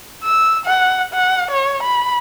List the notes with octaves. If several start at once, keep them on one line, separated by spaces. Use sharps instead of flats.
E6
F#5
F#5
C#5
B5